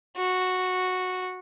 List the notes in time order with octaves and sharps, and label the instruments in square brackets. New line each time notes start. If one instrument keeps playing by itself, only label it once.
[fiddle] F#4